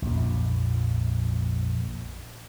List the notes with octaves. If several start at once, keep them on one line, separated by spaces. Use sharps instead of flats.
A#1 F2